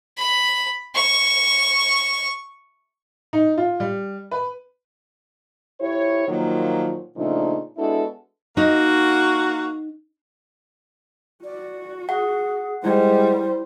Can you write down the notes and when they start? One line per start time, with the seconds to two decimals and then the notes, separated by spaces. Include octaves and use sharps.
0.18 B5
0.95 C#6
3.33 D#4
3.58 F4
3.80 G3
4.31 B4
5.81 F2 E4 G4 C#5
6.28 A#2 D#3 F3 F#3 A#3
7.16 A#2 C#3 F3 A3 D4 D#4
7.78 G#3 B3 D4 E4 F#4 A4
8.57 A#3 D#4 F#4
11.44 F#4 D5
12.09 G#4 F#5
12.84 G3 G#3 E4 C5